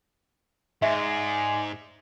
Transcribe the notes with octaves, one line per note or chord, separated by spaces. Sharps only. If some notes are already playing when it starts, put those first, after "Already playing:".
G#2 G#3 D5 E5